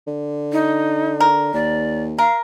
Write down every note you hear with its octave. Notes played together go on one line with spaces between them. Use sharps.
D3
D#4
A#4
D#2 D5
A#4 F5